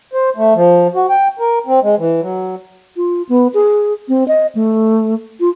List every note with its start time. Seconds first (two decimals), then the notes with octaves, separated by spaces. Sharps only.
0.13 C5
0.36 A3
0.55 F3
0.95 F#4
1.09 G5
1.39 A#4
1.67 C4
1.82 G#3
1.98 E3
2.21 F#3
2.96 F4
3.29 B3
3.54 G#4
4.08 C4
4.28 D#5
4.55 A3
5.40 F4